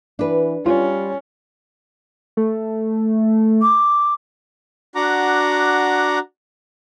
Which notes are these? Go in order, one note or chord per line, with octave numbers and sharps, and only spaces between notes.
E3 D4 B4
G3 C#4 F4
A3
D6
D4 F#4 F#5 A#5 D6